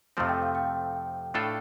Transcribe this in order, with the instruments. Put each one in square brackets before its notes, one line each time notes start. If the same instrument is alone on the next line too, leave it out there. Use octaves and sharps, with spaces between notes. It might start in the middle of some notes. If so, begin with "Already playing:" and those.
[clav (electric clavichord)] F2 C3 F3 A3 C4
[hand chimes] G5
F5
G5
[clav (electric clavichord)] A2 A3 D4 F4 A4